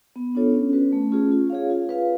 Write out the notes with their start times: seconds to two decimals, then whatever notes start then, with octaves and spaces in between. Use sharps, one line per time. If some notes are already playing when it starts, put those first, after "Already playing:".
0.16 B3
0.35 D4 F4 A4 C#5
0.54 C#4
0.73 F#4 B4
0.93 A3
1.12 C#4 F4 G#4
1.32 F4
1.50 G#4 C#5 F5
1.70 F4
1.89 B4 F5